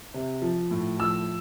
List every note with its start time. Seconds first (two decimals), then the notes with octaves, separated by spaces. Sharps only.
0.14 C3
0.42 F3
0.71 A2
0.99 F3 E6